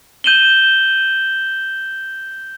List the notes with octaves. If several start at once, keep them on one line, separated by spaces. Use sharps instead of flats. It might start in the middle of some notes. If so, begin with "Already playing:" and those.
G6 D#7 E7 F#7 G7